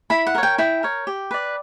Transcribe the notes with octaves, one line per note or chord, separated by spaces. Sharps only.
E4 B5
F#5
A#4 C#5
G5
E4 G5
A#4 C#5
G4
B4 D5